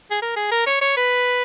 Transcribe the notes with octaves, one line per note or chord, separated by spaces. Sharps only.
G#4
A#4
G#4
A#4
C#5
C#5
B4